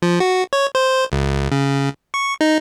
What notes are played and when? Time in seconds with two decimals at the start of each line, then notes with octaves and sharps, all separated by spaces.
0.02 F3
0.20 F#4
0.53 C#5
0.75 C5
1.12 C#2
1.52 C#3
2.14 C#6
2.41 D#4